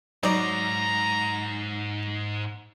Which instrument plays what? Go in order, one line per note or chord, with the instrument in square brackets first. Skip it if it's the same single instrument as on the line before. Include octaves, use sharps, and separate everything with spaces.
[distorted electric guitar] G#2 [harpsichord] F#3 [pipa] D#4 D5 [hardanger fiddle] A#5